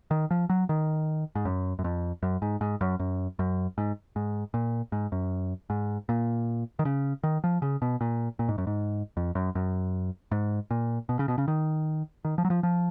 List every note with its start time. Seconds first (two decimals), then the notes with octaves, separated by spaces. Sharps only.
0.11 D#3
0.31 F3
0.50 F#3
0.69 D#3
1.35 G#2
1.45 F#2
1.79 F#2
1.84 F2
2.23 F#2
2.42 G#2
2.61 G#2
2.81 F#2
2.99 F#2
3.39 F#2
3.78 G#2
4.16 G#2
4.54 A#2
4.92 G#2
5.12 F#2
5.70 G#2
6.09 A#2
6.79 D#3
6.85 C#3
7.23 D#3
7.44 F3
7.62 C#3
7.82 B2
8.01 A#2
8.39 A#2
8.48 G#2
8.58 F#2
8.67 G#2
9.17 F2
9.35 F#2
9.55 F#2
10.32 G#2
10.71 A#2
11.09 B2
11.19 C#3
11.28 B2
11.38 C#3
11.48 D#3
12.25 D#3
12.38 F3
12.45 F#3
12.50 F3
12.63 F3